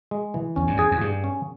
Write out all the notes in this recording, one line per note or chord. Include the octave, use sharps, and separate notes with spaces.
G#3
E3
E2 C#4
G2
E2 G#4
E2
G2 G#4
C#4